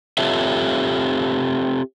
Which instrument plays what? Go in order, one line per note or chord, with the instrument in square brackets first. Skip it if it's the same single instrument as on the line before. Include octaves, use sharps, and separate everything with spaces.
[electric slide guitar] C4 F4 G4 A4 C#5 E5